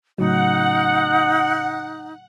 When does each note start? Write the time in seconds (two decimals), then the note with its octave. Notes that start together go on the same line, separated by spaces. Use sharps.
0.18 A2 C#3 F#3 D#4 F#5